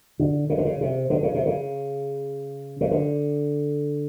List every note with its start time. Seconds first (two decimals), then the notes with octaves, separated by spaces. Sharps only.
0.19 D3
0.50 C#3
0.58 D3
0.65 C#3
0.81 C3
1.10 D3
1.23 C#3
1.34 C3
1.46 C#3
2.81 C#3
2.91 D3